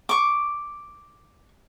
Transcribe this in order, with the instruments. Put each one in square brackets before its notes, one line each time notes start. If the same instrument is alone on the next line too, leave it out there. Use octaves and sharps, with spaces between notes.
[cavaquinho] C#6 D6